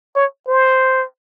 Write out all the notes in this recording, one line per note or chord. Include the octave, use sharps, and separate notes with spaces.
C#5
C5